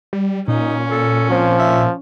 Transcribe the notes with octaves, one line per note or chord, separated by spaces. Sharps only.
G3
A#2 C#4 D#4
A4
F3 C4
E5